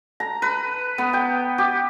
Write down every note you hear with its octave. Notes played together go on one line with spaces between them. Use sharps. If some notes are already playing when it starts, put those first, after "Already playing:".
A#5
B4
B3
G5
G4